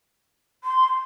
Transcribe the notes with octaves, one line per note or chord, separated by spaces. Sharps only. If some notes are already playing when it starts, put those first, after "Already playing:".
C6